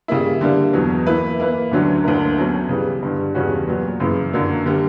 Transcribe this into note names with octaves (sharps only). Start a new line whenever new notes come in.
C#3 G3 A#3 E4
D3 G3 A#3
E2 B2 F#3
E3 A#3 E4 B4
E3 A#3 E4 B4
D2 D3 F#3 C#4
D2 D3 A#3 E4 A#4
B2 F#3 C#4
C#3 E3 G3 B3
G2 D3 G3
E2 C#3 G3 C#4 F#4
A#2 F#3 B3
F#2 C#3 E3
F#2 D3 F#3 A#3
D3 G3 A#3